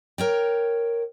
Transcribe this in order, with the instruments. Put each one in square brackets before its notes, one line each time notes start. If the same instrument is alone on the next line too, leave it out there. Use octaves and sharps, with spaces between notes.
[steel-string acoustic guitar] A#4 C#5 G5